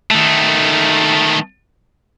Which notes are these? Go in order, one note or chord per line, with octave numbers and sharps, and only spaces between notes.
D#3 A3